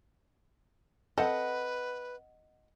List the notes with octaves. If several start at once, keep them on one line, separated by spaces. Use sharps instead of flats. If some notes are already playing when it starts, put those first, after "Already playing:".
C4 A4 B4 D#5 F#5